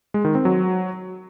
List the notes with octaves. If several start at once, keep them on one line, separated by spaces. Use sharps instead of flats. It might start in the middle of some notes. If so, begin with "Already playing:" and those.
G#3
D#3
C4
F#3